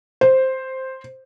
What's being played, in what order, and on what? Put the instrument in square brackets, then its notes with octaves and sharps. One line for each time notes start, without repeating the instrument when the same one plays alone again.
[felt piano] C5